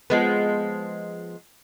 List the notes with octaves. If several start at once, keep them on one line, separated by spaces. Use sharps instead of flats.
F3 G#3 B3